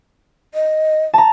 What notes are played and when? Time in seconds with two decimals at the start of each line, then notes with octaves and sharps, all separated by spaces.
0.54 D#5
1.14 A5 A#5